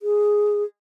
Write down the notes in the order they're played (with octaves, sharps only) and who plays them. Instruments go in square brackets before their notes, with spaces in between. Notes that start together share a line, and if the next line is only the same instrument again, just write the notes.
[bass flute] G#4